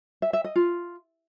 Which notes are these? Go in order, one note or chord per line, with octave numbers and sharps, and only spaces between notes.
E5
E5
D#5
F4